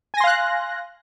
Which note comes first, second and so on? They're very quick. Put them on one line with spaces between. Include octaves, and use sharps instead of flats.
G#5 A#6 C6 F5 F#6